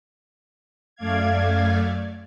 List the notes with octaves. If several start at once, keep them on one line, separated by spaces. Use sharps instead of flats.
F#2 A3 D5 F5 G#6